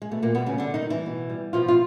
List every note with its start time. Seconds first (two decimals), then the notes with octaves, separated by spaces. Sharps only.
0.02 G#3
0.11 B2 A3
0.23 A#2 A#3
0.35 B2 G3 B3
0.46 C#3 C#4
0.58 B2 D3 D4
0.74 D#3 D#4
0.82 G3
0.90 E3 E4
1.06 B2
1.30 G3
1.53 B2 F3 F4
1.68 F4